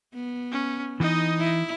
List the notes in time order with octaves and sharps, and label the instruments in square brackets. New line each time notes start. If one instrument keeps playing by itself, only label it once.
[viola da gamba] B3
[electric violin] C#4
[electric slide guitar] E3 [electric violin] D#4 D#5
[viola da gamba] E4